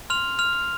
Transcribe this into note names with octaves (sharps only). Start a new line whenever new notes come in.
C6 F6 F7
F6 F7
F6